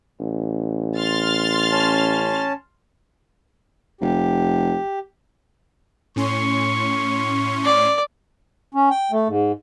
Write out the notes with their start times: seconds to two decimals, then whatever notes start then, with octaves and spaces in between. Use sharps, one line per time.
0.20 A1
0.97 C6 F6 A6
1.72 C#4 A5
4.01 F1 G4
6.16 A2 C#4 C6 C#6
7.64 D5
8.74 C#4
8.90 G5
9.11 A3
9.28 G#2